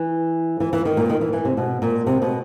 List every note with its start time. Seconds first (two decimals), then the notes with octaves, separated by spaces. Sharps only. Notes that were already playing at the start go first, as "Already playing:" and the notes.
Already playing: E3
0.60 E3
0.73 E3
0.85 D#3
0.97 A#2
1.10 D#3
1.21 E3
1.33 E3
1.45 C3
1.57 B2
1.82 A#2
2.06 C3
2.22 B2